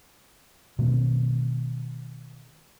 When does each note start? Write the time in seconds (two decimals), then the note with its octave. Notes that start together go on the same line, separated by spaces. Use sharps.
0.79 B2 D#3 A3 C4